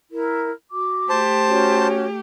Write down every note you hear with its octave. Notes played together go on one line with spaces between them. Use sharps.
E4 A#4
F#4 D6
A3 G4 C5 A5
C#4 F#4 C#5